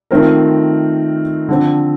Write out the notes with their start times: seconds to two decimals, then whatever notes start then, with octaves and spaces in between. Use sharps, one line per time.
0.11 D#3 A3 C4 F4 A#4
1.49 D3 F3 C4